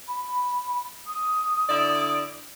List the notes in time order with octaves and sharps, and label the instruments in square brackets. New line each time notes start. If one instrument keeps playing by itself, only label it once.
[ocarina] B5
D#6
[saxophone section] D3 E4 D5